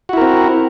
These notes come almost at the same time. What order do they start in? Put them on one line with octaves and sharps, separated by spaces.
F#4 E4 A#4 C4